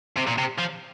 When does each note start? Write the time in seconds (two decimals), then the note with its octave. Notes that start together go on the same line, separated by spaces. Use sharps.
0.16 C3
0.27 A#2
0.38 C3
0.59 F3